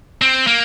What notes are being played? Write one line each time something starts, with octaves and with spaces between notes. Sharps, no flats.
C4
A#3